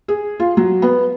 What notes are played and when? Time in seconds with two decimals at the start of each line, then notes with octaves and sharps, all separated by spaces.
0.08 G#4
0.40 F4
0.57 F#3
0.82 B3